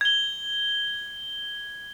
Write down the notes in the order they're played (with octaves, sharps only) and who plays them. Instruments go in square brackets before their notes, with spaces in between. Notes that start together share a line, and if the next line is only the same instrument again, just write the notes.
[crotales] G#6 G7